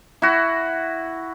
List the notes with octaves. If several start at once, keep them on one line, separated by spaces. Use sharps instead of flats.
E4 F#4